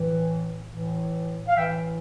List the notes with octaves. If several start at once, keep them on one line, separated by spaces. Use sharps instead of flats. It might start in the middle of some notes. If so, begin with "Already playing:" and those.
Already playing: A2 E3
A2 E3
F5
A2 E3 E5 G5